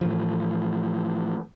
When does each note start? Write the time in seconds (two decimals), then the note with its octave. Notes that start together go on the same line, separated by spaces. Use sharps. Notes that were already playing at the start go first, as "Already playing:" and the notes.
0.01 A2 E3 F3